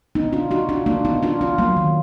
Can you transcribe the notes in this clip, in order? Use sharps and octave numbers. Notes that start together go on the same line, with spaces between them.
B3 D#4
D4 F4
D#4 F#4
D4 F4
A#3 D4
B3 D#4
D4 F4
D4 F4
F#3 A#3
D#3